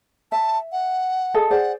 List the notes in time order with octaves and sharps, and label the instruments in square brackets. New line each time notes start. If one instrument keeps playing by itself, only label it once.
[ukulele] E5 [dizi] A5
[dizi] F#5
[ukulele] G#4 A4 D#5
[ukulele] G#4 C5 D5 [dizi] F#5